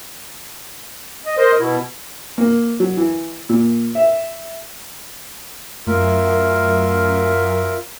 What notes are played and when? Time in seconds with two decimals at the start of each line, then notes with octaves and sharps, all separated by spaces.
1.26 D#5
1.37 A#4 C5 D#5
1.60 B2 E4
2.38 A#3
2.80 F#3
2.97 E3
3.49 A#2
3.95 E5
5.87 F#2 A3 F4 A#4 E5